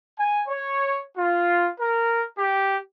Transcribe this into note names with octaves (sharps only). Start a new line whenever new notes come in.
G#5
C#5
F4
A#4
G4